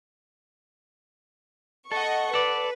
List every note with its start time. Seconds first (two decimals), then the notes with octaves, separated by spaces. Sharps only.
1.92 A4 D#5 F#5 C#6
2.34 A4 B4 D5